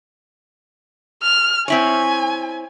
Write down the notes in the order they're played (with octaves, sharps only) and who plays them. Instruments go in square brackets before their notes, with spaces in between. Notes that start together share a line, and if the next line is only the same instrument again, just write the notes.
[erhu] F6
[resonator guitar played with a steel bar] C4 E4 C#5 [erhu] G#5